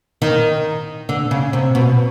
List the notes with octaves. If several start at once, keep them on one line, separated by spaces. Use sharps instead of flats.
D#3
D3
C#3
C3
B2